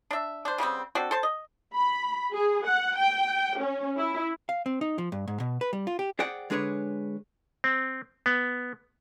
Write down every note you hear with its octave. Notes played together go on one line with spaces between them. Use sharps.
D4 E5
D4 C5
C#3 G3 B3 C4
C4 D4 F#4 A4
A4 C5 A5
D#5
B5
G#4
F#5
G5
C#4
E4
F5
C4
D#4
F3
G2
G#2
B2
B4
G3
F4
G4
G#4 C5 D5 F#5 G5
D3 G#3 D4 G#4 B4 C#5
C4
B3